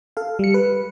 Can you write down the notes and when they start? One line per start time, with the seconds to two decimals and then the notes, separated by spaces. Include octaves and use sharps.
0.17 A4 F5
0.39 G3 C#7
0.54 B4